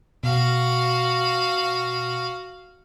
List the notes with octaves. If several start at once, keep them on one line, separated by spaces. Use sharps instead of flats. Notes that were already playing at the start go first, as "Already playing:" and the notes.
B2 F#4 F5